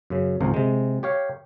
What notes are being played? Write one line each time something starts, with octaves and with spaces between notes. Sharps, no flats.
F#2 C#3
G#1 C#2 F3 A#4
C3 G#3
G4 C#5 F5